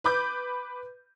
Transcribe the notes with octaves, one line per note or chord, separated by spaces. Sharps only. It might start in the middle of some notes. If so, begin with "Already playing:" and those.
B4 B5 D6 G6